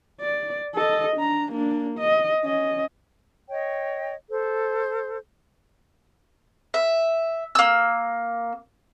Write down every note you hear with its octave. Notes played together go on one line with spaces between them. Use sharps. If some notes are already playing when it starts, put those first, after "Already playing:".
D5
A4 D#5
D4 A#5
A#3 D4
D#5
C#4 D#5
C#5 D#5 G5
A4 C5
E5
A#3 E6